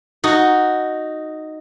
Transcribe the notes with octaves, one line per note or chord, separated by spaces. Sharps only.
D#4 F#4